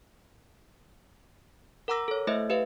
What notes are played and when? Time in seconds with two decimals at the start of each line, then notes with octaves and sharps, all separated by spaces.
1.88 A#4 F#5 A#5 D6 E6 A#6
2.08 A4 C#5
2.27 A3 E4 C5 D#5 E5
2.50 G4 B4 E5 F5